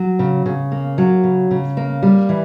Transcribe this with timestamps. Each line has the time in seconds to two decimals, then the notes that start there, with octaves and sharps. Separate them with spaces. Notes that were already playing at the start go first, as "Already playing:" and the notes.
Already playing: F#3
0.19 C#3
0.46 C#3
0.72 A#3
0.98 F#3
1.24 C#3
1.51 C#3
1.77 A#3
2.03 G3
2.29 E3